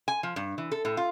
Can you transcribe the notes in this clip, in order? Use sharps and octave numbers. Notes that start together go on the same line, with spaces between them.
G#5
F3
G2
E3
A4
A2
F4